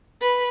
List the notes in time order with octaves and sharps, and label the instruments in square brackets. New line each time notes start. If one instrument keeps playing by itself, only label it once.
[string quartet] B4